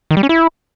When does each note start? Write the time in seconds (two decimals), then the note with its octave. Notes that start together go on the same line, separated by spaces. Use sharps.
0.11 D#3
0.17 G3
0.23 C#4
0.29 E4